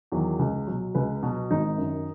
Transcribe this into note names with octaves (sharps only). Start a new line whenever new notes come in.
E2 D#3 F#3
C#2
B2 F#3
C#2 B4
B2 F#3
G#1 D#4
F#2 D#3